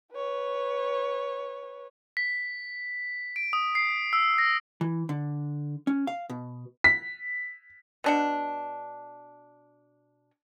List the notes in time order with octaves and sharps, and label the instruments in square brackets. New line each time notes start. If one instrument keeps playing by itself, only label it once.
[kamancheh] B4 C#5
[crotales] B6
D7
D#6
C7
E6
A#6
[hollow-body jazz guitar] E3
D3
C#4
F5
B2
[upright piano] B6
[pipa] B2 D4 F#5